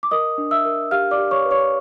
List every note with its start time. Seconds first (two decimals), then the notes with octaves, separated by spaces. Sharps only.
0.03 D6
0.11 A#4 D#5 D#6
0.38 D4
0.51 E5 E6
0.65 A#4
0.91 G4 F5 F6
1.11 D5 D6
1.18 G4
1.31 C#5 C#6
1.45 B4
1.51 C#5 C#6